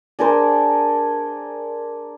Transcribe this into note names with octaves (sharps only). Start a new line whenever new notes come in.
D4 G#4 A#4 C5